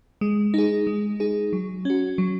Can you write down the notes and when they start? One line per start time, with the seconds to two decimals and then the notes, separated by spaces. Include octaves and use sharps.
0.21 G#3
0.54 D#4 G#4
0.87 G#3
1.20 D#4 G#4
1.53 F#3
1.85 C#4 F#4
2.18 F#3